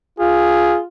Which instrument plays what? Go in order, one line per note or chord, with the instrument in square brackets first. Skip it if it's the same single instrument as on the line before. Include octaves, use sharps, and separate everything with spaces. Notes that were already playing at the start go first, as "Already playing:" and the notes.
[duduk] F4 [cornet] G#4